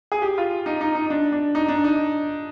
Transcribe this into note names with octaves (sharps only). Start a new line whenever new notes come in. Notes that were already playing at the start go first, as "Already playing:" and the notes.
G#4
G4
F4
D#4
D#4
D#4
D4
D4
D#4
D4
D#4